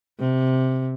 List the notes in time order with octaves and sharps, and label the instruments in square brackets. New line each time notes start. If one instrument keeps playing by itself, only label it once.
[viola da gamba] C3